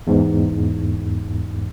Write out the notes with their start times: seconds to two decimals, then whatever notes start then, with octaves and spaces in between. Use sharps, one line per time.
0.07 E2 G#2